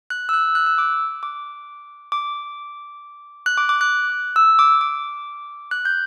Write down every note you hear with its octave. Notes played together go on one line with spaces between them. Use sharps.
F#6
E6
F#6
F#6
E6
D6
D6
D6
F#6
D6
D6
F#6
E6
D6
D6
F#6
G6